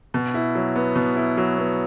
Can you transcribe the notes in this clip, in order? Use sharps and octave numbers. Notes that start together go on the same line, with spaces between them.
B2
E4
F#3
B3
B2
E4
F#3
B3